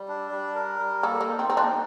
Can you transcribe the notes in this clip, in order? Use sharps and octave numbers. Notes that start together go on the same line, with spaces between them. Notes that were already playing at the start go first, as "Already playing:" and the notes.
Already playing: G3
D4
G3
A#4
G3
A#3 A4
A#3
D#4
C4
C4 D#4
A#3 D4